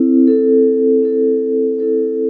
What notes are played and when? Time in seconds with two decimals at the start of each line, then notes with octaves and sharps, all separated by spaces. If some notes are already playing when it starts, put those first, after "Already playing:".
Already playing: C4 E4 A4 C5
0.27 C4 E4 A4 C5
1.02 C4 E4 A4 C5
1.78 C4 E4 A4 C5